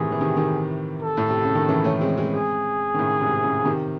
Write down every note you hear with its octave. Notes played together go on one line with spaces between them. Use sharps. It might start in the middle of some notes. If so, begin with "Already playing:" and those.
Already playing: A2 C3 D#3 E3 G#4
E3
C3 D#3
C3 D#3
A4
A2
C3
C#3
D#3
C#3 E3
A3 C#4
G#3 C4
G#3 C4
G#4
D#3
A2 C#3
G#2 C3
A2 C#3
C#3
C3 D#3